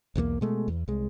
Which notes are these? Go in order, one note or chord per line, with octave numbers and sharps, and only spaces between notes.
B1 E2 D#3 A#3
B2 G#3 A3
E2
C2 G#3